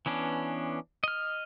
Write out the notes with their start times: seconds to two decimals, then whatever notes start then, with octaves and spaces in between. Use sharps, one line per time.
0.06 E3 B3 C#4 D4
1.04 D#5 F6